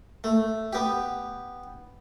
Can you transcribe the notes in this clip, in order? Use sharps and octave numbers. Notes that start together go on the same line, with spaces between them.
A3
B3 G4